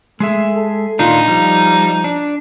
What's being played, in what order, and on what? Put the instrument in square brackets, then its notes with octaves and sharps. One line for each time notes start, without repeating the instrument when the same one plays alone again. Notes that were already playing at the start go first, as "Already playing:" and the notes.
[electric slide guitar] G#3 G#4 E5 [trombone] A3
[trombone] A4
[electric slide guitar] A#2 D#3 D4 [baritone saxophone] D#4 [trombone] F4
[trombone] F3 [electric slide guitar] G3
[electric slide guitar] D4